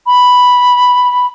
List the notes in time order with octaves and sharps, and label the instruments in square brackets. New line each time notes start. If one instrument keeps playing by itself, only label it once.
[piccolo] B5